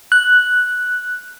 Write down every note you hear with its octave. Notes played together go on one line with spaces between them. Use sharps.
F#6